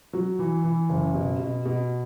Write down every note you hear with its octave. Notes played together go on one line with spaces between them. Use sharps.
F#3
E3
E3
F#1
B2
B2
B2